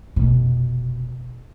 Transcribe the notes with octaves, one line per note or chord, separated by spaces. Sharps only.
F1 B2